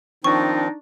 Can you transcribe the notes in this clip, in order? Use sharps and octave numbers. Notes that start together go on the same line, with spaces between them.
D#3 F3 C4 D4 D#4 C#6